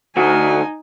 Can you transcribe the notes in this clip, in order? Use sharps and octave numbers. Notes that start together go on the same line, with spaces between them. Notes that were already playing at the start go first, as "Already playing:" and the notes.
D2 D#4 F#4 G#5